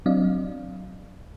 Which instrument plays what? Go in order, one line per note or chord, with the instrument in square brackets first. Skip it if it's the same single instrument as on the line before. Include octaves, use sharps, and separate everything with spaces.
[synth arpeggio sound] F#3 C4 D4 D5 D#5 F5